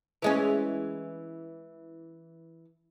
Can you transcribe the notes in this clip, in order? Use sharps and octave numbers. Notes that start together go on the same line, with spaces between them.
E3 G#3 C#4